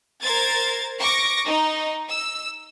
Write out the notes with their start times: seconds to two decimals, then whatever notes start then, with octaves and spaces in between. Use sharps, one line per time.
0.22 A#4 C5 G#6 A6
1.00 C#6 D6 A#6
1.47 D#4
2.10 E6